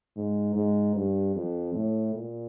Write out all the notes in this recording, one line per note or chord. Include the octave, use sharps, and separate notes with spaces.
G#2
G#2
G2
F2
A2
A#2